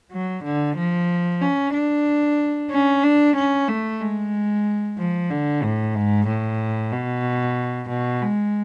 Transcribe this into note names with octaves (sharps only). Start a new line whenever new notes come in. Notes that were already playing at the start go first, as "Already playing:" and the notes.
F#3
D3
F3
C#4
D4
C#4
D4
C#4
A3
G#3
F3
D3
A2
G#2
A2
B2
B2
G#3